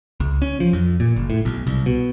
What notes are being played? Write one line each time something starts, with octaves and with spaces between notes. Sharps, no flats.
C#2
C#4
F3
F2
A#2
F#1
A2
B1
C2
B2